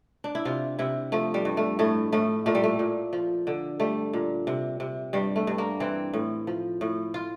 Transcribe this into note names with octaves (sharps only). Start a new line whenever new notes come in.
D4
E4
C3 F4
C3 E4
F3 A3
G3
G2
A3
A2 A3
A2 A3
A#2 A3
G3
A3
A#2
F3
D3
G3 A3
A#2
C3
C3
G2 G3
A3
G2
A#3
E3 C4
A2
F3
A2
F4